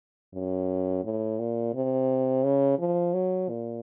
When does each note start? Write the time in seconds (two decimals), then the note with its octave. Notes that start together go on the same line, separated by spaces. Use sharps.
0.34 F#2
1.04 A2
1.39 A#2
1.74 C3
2.43 C#3
2.79 F3
3.14 F#3
3.49 A#2